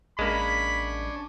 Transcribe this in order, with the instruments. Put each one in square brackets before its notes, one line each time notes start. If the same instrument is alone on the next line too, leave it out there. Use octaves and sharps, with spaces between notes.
[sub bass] A1 [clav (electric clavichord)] G#3 A#3 [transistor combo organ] C#4 D4 [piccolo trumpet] B5